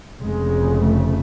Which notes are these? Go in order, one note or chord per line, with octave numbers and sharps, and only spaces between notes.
F1 F2 C#3 G#3
A3